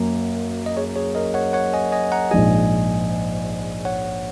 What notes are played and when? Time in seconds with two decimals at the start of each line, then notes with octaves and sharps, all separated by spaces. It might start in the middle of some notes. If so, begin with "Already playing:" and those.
Already playing: F#2 A#3 F#4 A#4
0.66 D#5
0.77 G#4 C#5
0.96 G#4 C#5
1.15 A#4 D#5
1.34 C#5 F#5
1.53 C#5 F#5
1.74 D#5 G#5
1.92 D#5 G#5
2.12 F#5 A#5
2.31 A#1 G#2 G#3 D#5 G#5
3.85 C#5 F#5